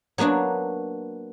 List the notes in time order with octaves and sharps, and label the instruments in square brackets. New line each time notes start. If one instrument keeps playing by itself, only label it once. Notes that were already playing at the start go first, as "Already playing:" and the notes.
[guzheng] F#3 A#3 B3 D4 F#4